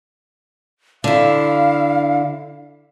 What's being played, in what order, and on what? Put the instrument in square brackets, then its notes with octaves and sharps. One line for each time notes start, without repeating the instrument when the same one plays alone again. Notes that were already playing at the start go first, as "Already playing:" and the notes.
[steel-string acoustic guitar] D3 E4 [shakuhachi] F5